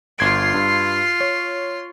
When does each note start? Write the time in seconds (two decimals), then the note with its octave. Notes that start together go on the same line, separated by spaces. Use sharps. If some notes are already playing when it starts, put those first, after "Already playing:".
0.19 G1 F4 C6 G#6 D7
0.54 G2
1.21 C#5